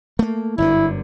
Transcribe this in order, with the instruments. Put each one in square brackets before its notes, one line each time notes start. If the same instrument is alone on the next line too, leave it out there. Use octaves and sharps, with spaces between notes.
[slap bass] A3 A#3
[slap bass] G1 F#2 D3 [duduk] E4